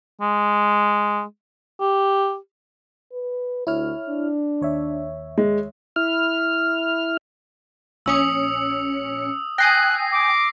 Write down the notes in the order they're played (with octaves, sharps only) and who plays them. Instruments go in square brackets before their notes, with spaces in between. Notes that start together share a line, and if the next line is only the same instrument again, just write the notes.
[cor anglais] G#3
G4
[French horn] B4
[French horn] D2 [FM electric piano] E4 C#5 F6
[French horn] D4
[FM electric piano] D#2 C#5 E5
[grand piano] G#3
[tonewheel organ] E4 F6
[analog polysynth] A#1 C#4 C#7 [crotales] D#6 E6
[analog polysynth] G5 G#5 D#6 [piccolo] F#6 [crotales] A#6 C7
[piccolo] D6